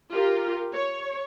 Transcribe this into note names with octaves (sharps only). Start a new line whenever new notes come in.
F4 G4 A#4
C#5